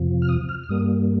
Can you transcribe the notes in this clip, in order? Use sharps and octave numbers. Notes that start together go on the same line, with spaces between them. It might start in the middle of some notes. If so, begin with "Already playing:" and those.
Already playing: F2 C3 F3
F6
D#6
F6
F6
G2 G3 A#3 D#6